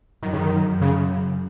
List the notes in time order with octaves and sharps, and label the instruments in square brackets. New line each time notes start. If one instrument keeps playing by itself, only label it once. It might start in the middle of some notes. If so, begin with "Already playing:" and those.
[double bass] F#2 [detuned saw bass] D#3
[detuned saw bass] C#3
D#3
[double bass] F#2
[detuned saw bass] C#3